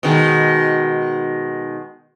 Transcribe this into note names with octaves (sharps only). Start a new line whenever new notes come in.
B2 D#3 G#3